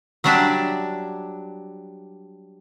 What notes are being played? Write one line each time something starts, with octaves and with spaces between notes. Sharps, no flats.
F#3 G3 D4 D5 E5